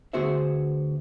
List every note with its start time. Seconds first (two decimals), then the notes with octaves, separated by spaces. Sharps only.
0.13 D2 B3 F#4 G#4 C5 E5